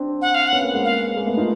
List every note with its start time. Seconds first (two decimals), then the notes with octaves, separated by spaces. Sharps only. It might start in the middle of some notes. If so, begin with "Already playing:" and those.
Already playing: C4 D4
0.22 F#5
0.34 F5
0.48 F#5
0.53 B3 C#4
0.63 A#3 C4
0.74 G#3 A#3
0.84 F5
1.16 G#3 A#3
1.27 A3 B3
1.37 D#4 F4